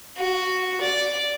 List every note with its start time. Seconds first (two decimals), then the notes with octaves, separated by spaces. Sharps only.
0.16 F#4
0.80 D5